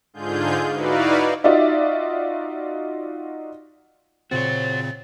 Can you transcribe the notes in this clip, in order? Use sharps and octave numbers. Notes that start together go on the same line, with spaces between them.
G#2 D3 F4 G#4 G6
D#4 E4 F#4 B4 D5 F5
D#4 F4 F#4 D5 E5
A#2 C#3 C4 F#4 C5 C#5 A6